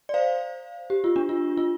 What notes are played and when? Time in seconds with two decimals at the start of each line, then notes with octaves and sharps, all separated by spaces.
0.09 D5
0.14 C5 F5
0.90 G4
1.04 F4
1.16 D4
1.29 F4
1.57 F4